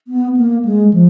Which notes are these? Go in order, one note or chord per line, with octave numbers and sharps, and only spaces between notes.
B3
A#3
G#3
F3